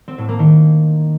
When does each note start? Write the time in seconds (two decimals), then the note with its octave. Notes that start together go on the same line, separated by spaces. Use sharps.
0.08 C4
0.18 A2
0.29 A#3
0.39 D#3